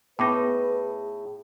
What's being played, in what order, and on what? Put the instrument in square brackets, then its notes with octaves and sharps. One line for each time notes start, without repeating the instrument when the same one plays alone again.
[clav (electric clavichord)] A2 D#4 [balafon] B3 D6 [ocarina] G#4 [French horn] B4